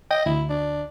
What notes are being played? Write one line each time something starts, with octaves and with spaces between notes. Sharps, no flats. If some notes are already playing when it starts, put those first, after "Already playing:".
D#5 G5
D2 E4
D4